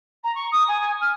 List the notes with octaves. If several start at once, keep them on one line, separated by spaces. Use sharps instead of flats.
A#5
C#6
D#6
G#5
F6